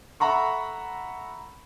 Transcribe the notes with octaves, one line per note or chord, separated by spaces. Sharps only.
A4 E5 F#5 A#5 B5 C#6